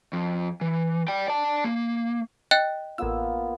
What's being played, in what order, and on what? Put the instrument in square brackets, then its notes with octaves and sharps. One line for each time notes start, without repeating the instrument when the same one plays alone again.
[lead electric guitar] F2
E3
D5 G5
D5 A5
A#3
[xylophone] D#5 G5 F#6
[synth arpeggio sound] A1 E6 [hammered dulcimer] A#3 B3 F4